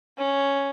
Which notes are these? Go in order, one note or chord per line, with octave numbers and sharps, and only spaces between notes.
C#4